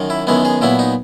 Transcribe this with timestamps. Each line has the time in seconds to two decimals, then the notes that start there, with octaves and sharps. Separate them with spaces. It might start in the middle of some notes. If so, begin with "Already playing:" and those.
Already playing: F#2 D#3
0.10 E4
0.27 F#2 D#3 G#3 B3 E4
0.45 G#4
0.61 A#2 F#3 B3 E4
0.79 D#4